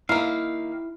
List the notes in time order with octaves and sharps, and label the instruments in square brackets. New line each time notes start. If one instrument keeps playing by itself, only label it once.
[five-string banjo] D#3 A#3 [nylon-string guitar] E4 [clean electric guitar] F5